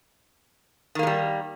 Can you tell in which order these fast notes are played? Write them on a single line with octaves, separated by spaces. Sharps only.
D#3 A#3 G#3 G3